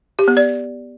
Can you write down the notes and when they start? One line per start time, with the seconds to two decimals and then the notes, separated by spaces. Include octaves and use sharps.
0.19 G4
0.28 B3
0.37 D5